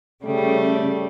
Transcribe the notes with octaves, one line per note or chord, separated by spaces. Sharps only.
C#3 G3 A3